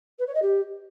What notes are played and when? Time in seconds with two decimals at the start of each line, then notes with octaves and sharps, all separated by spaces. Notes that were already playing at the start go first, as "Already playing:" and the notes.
0.19 B4
0.26 C#5
0.34 D#5
0.42 G4